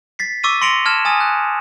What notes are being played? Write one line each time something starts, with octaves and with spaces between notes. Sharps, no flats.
A6 B6 C7
C#6 D6 E6 A6 B6 D#7
C6 A#6 C#7 D7 F7 F#7
A5 F6 G#6 E7
G#5 D#6 A6
F#6